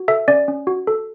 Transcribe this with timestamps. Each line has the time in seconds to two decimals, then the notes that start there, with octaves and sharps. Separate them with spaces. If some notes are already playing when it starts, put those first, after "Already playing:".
Already playing: F#4
0.08 A4 E5
0.28 C#4 D5
0.48 C#4
0.67 F#4
0.87 A4